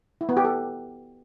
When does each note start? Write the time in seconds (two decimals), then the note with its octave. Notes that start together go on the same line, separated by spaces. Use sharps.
0.21 E4
0.29 B3
0.37 G4
0.45 A4